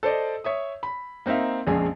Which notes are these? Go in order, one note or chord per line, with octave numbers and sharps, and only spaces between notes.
A4 C5 D5 D#5
C#5 E5 D#6
B5
A#3 C4 D#4 E5 F5
A#1 F2 C#3 G#3 G#5